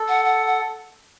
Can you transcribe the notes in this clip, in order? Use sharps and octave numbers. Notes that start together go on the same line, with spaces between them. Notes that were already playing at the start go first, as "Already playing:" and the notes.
Already playing: A4
F#5
F#5
F#5